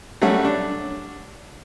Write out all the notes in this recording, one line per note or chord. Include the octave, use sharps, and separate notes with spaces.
F#3 G3 A3 C#4 F#5
D4